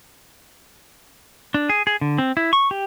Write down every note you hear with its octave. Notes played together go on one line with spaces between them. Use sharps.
D4
G#4
G#4
D3
C4
E4
C#6
G4